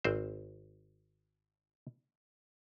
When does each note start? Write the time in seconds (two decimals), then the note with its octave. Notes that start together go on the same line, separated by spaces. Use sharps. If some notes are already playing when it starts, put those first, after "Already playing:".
0.05 G#1 C4 C5